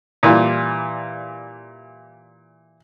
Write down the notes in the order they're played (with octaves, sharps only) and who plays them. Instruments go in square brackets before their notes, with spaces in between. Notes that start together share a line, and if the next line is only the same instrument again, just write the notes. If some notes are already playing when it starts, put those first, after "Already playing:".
[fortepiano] A#2 E3 G3 F4